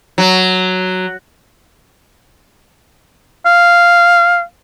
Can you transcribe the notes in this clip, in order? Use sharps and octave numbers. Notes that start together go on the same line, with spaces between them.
F#3
F5